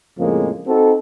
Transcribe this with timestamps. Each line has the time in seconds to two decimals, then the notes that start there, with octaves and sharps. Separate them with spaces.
0.18 F2 A2 C#3 F3 G#3 A#3
0.67 C4 D#4 F#4 A4